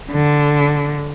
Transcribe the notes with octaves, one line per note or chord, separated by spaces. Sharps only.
D3